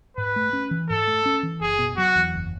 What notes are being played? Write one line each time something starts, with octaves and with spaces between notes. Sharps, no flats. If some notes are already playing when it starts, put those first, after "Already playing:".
G#2 B4
A3
C#4
E3
G#2 A4
A3
C#4
E3
F#1 G#4
B2
F#3 F#4
E2
F#1